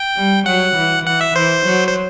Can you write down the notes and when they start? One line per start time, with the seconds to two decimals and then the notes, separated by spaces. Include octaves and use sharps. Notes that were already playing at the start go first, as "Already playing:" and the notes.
Already playing: G5
0.16 G3
0.46 F#3 F#5
0.76 E3
1.05 E3 F#5
1.21 E5
1.35 E3 C5
1.66 F#3
1.88 C5